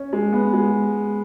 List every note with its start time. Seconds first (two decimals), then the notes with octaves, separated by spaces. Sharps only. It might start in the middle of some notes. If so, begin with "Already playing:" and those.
Already playing: C#4
0.13 G#3
0.33 B3
0.53 G#3